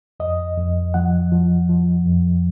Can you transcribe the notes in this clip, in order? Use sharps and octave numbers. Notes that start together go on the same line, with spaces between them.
F2 D#5
F2
F3 F#5
F3
F3
F2